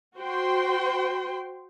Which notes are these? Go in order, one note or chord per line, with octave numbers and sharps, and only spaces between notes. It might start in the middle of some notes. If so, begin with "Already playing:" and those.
F#4 C5 G5 C6